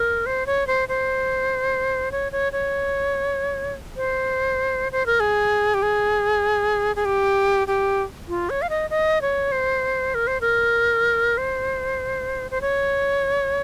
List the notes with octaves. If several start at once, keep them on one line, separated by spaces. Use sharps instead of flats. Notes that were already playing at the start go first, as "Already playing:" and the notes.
Already playing: A#4
C5
C#5
C5
C5
C#5
C#5
C#5
C5
C5
A#4
G#4
G4
G#4
G#4
G4
G4
F4
C#5
F5
D#5
D#5
C#5
C5
A#4
C5
A#4
C5
C5
C#5